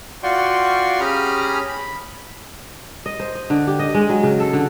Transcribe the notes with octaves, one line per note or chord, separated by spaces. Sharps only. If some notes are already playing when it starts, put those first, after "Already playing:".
F4 F#4 D5 G5 C6 C#6
C#4 G4 G#4 A#5 B5 F6
B5
D#5
C5
D#5
D3
G4
D#5
G#3
F#3
C#3
A4
D3